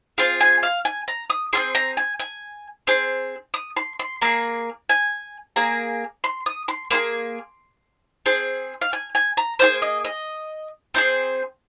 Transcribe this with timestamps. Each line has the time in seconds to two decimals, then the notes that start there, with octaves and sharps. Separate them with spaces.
0.18 C4 F4 G#4 F5
0.40 G#5
0.63 F5
0.85 G#5
1.08 A#5
1.30 D#6
1.53 C4 F4 G#4 C6
1.75 A#5
1.97 G#5
2.20 G#5
2.87 C4 G#4 C6
3.54 D#6
3.77 C6
3.99 C6
4.21 A#3 G#4 A#5
4.89 G#5
5.56 A#3 G#4 A#5
6.24 C6
6.46 D#6
6.68 C6
6.91 A#3 F4 G#4 C6
8.26 C4 G#4
8.82 F5
8.93 G#5
9.15 G#5
9.37 A#5
9.59 A#3 F4 G#4 C5
9.82 D#5
10.04 D#5
10.94 C4 D#4 G#4 C5